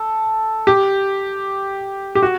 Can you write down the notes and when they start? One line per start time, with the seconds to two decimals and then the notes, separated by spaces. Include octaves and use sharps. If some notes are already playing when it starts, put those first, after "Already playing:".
Already playing: A4
0.67 G4
2.15 G4
2.22 F#4